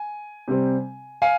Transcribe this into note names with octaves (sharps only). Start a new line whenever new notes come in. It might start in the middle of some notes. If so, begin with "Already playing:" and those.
Already playing: G#5
C3 G3 C4
F5 G#5